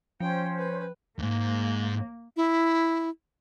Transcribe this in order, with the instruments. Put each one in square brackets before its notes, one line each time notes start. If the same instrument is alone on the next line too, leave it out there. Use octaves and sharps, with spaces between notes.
[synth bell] F3 [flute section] C#4 C5 [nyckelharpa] G5
[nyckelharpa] B4
[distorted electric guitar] D#2 G#2 [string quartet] A#3
[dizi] E4